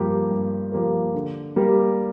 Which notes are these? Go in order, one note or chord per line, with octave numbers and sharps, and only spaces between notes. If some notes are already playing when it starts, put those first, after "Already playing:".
Already playing: G2 F3 A#3 G4 A#4
G2
F3 A#3 G4 A#4
D3
G3 A#3 G4 A#4